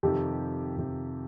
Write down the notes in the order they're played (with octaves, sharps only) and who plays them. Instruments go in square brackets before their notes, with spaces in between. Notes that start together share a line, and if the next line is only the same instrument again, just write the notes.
[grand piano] F2 C3 D#3 [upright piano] G4
[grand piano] F2 C3 D#3